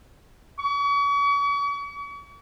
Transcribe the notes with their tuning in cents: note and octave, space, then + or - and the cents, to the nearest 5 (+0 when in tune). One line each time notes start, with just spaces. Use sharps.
C#6 +40